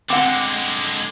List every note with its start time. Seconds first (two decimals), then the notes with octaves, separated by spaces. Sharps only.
0.10 D3 G#3 C4 F#5 D6